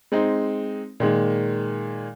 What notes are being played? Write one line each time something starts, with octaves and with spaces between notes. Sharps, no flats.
G#3 C4 D#4
A#2 D#3 G#3